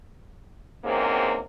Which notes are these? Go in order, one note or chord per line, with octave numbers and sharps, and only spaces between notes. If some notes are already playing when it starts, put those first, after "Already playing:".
E2 G#2 C3 A#3 C4 C#4